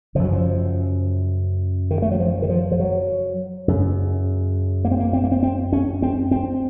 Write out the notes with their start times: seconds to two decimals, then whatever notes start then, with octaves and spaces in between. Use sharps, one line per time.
0.15 C#3 F3
0.19 F#2 F#3
0.32 F3
1.91 D#3
2.02 A3
2.12 F#3
2.20 F3
2.42 D#3
2.49 F3
2.72 F3
2.80 F#3
3.68 F#2 C#3
4.85 A#3
4.91 C4
4.99 A#3
5.13 C4
5.24 A#3
5.32 C4
5.43 C4
5.73 C#4
6.02 C4
6.31 C4